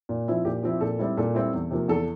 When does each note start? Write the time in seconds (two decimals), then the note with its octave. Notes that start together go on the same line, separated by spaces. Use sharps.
0.09 A#2
0.28 F3 C4 E4
0.45 A#2 G4
0.63 F3 C4 E4
0.81 A#2 A4
0.99 G3 C4 E4
1.17 A#2 A4
1.34 G3 C4 E4
1.53 E2
1.71 C3 F3 A#3
1.88 E2 A4